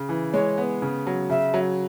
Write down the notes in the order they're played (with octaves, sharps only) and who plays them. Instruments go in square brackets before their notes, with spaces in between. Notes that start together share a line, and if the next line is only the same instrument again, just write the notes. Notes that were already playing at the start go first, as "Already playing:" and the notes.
Already playing: [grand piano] C#3
E3
[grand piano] G#3 [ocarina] C#5
[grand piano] B3
C#3
F#3
[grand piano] C#3 [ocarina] E5
[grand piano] F#3